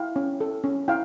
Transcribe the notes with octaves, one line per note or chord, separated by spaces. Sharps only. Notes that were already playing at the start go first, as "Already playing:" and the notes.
Already playing: E4 F5 G5
C#4
A4
C#4
E4 F5 G5